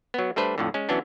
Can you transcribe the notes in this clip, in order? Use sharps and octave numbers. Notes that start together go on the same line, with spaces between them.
F#3 B3
G3 A3 D4 B4 C5
F2 A2 D3
G#3 C#4
E3 F#3 B3 C#4 D4